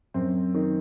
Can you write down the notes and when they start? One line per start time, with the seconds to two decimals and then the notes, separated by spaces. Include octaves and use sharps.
0.14 F#2 C4
0.54 D#3